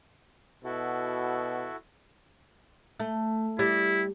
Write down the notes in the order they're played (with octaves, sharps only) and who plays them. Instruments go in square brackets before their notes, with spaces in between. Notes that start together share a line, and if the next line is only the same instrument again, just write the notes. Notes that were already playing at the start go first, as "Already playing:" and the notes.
[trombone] B2 [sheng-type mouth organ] E4 F#4 A4
[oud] A3
[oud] G3 [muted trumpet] E4